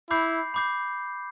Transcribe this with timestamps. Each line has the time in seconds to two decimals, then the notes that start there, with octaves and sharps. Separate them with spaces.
0.10 E4 B5 D6 G6 C7
0.54 B5 D6 G6 C7